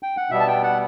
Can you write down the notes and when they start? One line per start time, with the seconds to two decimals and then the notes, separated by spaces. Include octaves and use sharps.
0.03 G5
0.17 F#5
0.30 B2 G3 B3 E5
0.40 A5
0.47 G5
0.64 F#5